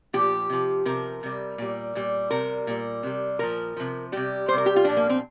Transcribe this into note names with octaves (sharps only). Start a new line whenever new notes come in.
A#2 F3 G4
C3 F3
C3 F3 A#4
C3 G3
A#2 G3
A#2 G3
C3 G3 A#4
A#2 G3
C3 G3
A#2 F3 A#4
C3 F3
C3 G3 G4
G3 C5
C3 A#4
G4
F4
A#2 F3 D4
A#3
C4